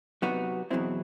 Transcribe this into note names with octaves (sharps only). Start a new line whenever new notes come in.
C3 F#3 B3 D#4 F#4
E2 B2 F#3 C4 E4